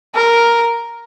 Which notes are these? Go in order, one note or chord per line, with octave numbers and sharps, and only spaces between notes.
A#4